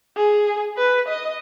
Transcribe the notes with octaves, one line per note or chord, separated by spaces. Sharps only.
G#4
B4
D#5